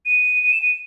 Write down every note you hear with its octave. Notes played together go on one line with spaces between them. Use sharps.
D#7
D#7
E7
D#7